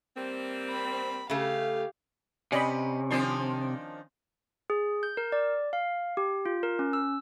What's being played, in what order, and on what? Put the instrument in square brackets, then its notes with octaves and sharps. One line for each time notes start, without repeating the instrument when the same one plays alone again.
[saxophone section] G3 A#3 C4
[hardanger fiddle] B5
[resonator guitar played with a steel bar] C#3 A3 [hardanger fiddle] G4 F5
[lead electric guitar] C3 [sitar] C#4 [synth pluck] D5 D#5 B5
[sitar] D#3 F3 D4 [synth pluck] C4 G#5 C6
[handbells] G#4
G6
A#4
D5
F5
G4
F4
A#4
C#4
E6